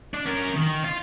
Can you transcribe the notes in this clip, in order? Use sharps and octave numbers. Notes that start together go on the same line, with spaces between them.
D4
C#4 A#4
D#3
F4